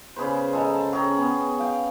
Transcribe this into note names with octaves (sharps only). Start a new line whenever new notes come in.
C#3 G#4 B4 C5
G#3 A4 G#5 A#5
A5
C#4 G#4 G5 A#5
B3
F5 G5